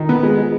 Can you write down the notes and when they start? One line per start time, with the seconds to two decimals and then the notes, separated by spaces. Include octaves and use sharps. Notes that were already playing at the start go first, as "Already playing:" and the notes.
Already playing: D#3
0.09 B3
0.23 G#3
0.38 G#3